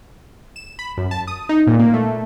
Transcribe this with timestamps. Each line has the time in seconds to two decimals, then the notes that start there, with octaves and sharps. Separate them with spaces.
0.56 E7
0.79 B5
0.97 F#2
1.11 A5
1.27 D#6
1.49 D#4
1.67 A#2
1.79 A#3
1.94 A3